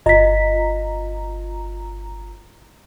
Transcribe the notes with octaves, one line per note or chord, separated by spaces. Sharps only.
G1 F4 D#5 A#5 B6